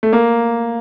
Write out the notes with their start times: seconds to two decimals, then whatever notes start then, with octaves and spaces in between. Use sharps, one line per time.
0.03 A3
0.13 A#3